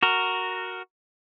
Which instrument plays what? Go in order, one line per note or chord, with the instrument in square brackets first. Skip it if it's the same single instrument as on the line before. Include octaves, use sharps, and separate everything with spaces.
[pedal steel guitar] F#4 A#4